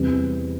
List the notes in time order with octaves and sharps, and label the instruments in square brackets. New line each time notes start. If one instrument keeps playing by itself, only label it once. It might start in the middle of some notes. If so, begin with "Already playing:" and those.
Already playing: [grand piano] E2 C3 G3 C4